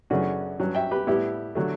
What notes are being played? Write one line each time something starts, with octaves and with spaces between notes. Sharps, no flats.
F#2 C#3 E3 A3 C#4 D4 F#4
G2 F#3 C#4
E5 G5
G4 B4
A2 G3 B3 E4 G4
D3 F#3 A3